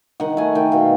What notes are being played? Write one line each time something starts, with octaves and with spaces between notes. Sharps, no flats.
D#3 F#5
A3 G#5
D#3 G5
B2 F5